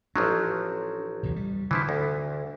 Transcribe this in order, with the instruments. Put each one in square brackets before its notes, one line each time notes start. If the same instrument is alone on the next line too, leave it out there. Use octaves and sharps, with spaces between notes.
[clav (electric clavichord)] A1 F3 F#3 [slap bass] D4
[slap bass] B1 E2 B2
G3
[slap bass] D3 D4 [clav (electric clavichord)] E3 F3 E4
[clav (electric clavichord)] D2